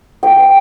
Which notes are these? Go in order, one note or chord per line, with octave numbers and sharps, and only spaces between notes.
G5